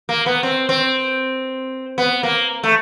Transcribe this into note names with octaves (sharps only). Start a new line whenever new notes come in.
A#3
B3
C4
C4
B3
A#3
A3